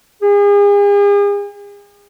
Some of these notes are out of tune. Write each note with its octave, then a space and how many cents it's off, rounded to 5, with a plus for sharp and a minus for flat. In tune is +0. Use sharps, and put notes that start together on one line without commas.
G#4 -40